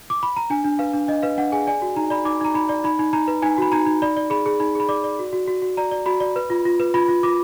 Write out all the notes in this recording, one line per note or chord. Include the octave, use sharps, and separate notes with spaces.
D6
B5
A#5
D4 G#5
D4
B4 F5
D4
D4 D#5
B4 F5
D4 F#5
G#4 G#5
D5 G#5
F#4
D#4 A#5
D5 B5
D#4 D6
D#4 A#5
D#4 B5
D5
D#4 B5
D#4
D#4 A#5
B4
D#4 G#5
F#4 B5
D#4 A#5
D#4
D5 B5
D5
G#4 B5
G#4
D#4 B5
G#4 B5
D5 D6
D5
F#4
F#4
F#4
F#4
D5 A#5
D5
F#4 B5
D5
B4
F4
F4
B4
F4 B5
F4
F4 D6